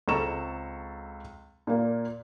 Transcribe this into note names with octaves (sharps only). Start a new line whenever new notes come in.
C#2 C4 A4 A#5 C#6 E7
A#2 A#3